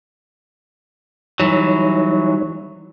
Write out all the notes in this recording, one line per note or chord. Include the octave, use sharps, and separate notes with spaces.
E3 F#3 G3 D#4 C#5